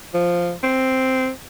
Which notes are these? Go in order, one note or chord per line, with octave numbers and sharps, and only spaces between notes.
F3
C4